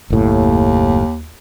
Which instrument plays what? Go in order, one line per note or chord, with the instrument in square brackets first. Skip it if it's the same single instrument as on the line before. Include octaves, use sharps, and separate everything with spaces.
[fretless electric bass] F#1 A2 [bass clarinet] D#2